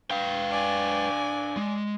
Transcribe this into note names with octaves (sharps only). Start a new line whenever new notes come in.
D4 B4 F5 G5
D5 G#5
G#3